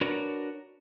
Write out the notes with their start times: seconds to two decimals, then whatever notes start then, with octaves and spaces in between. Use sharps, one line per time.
0.01 D4 F#4 A#4 B4 C#5